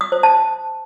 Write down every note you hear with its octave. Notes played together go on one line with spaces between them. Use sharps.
D#6
C5
A5